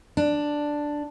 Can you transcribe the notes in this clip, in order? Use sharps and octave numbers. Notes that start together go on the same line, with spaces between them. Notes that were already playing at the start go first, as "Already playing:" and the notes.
D4